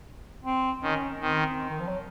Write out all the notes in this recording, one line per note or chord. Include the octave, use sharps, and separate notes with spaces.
C4
D#3 C#4
D#3 C4
D#3
F3
F#3